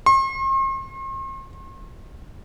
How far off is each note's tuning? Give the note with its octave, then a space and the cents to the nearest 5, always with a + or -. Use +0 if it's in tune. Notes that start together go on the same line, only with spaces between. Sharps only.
C6 +45